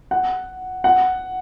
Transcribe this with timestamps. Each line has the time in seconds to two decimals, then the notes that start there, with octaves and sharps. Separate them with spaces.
0.11 F#5
0.84 F#5